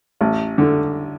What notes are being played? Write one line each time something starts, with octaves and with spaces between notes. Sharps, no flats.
A1
D3